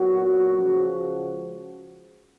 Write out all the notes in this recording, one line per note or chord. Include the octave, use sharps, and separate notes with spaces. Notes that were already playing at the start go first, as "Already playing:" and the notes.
Already playing: A#2 F#3 B3 F#4
C#2 C#3 F3 G#3